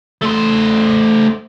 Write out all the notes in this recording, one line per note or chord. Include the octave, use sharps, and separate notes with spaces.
A3 C5